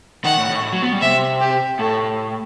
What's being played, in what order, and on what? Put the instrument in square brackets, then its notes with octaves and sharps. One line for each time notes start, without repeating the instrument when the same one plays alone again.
[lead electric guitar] D#3 [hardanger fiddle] F#5
[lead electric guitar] A2
A2
A2
F#3
B3
G3
[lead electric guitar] C3 [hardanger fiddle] E5
[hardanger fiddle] G4
[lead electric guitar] A2 [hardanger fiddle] A4